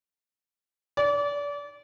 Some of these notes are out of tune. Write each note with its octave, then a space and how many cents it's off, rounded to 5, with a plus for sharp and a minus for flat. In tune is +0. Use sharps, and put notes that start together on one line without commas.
D5 -30